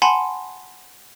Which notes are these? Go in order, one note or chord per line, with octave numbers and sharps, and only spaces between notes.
F#5 G#5 A5 B5 C6